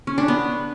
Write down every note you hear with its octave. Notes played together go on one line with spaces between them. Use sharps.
C#4
D4
B3